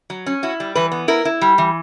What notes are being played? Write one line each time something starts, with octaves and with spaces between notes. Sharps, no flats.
F#3
C#4
E4 F#4
G3
E3 B4
B3
E4 A#4
E4
G3
E3